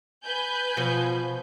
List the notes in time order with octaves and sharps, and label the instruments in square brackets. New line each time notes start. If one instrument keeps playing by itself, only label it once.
[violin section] B4 G#5 G6
[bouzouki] B2 [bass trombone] F3